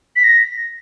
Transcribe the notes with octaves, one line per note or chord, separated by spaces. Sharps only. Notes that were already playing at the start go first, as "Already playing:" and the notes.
B6
A#6